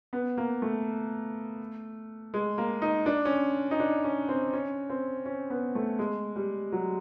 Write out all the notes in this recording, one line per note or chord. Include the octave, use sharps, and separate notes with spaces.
B3
A#3
A3
G#3
A#3
D#4
D4
C#4
D#4
D4
C#4
C4
C#4
C4
C#4
B3
A3
G#3
G3
F#3